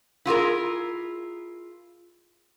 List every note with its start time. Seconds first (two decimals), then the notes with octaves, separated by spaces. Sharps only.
0.26 E4 F4 G#4 A#4